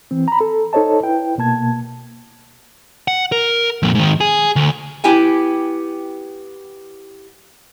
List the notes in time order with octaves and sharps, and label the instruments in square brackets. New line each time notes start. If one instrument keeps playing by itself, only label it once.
[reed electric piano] E3 C4
A#5 B5
A4
D#4 A4 C5 C#5 D#5 A5
E4 B4 G5
B2 A#3 A5 G#6
[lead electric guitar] F#5
A#4
F2 A#2
G#2 D#3
G#4
D2
[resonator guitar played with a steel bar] B3 E4 G4 G5 G#5